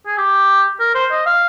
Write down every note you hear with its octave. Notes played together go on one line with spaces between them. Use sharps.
G#4
G4
A#4
C5
D#5
F5